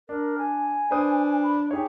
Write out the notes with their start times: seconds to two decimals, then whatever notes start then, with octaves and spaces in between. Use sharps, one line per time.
0.09 D4 A#4
0.38 G#5
0.91 D4 B4 C5 D#6
1.43 B5
1.71 D#4 G4 G#4 C#5